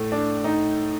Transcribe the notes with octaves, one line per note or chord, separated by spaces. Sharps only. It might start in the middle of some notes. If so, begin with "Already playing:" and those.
Already playing: A2 A3
D4
D#4